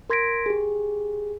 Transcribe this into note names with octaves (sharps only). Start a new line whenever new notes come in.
A#4 C6 G#6 A#6 B6 D7
G4 G#4